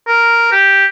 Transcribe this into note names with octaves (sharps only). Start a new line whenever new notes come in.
A#4
G4